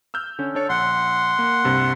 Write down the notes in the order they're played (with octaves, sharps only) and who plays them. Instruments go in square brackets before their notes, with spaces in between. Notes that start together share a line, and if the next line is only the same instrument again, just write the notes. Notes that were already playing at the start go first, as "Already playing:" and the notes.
[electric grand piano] E6 F6 G6
D3 C#4
[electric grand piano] D4 C#5 C#7 [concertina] A4
[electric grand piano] A#1 [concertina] F#5 C6
[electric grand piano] A#3
C2 G2 C3